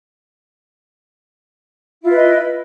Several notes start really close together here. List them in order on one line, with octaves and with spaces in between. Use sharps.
E4 F4 B4 D#5